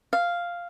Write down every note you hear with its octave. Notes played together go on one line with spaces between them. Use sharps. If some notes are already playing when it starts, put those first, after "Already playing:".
F5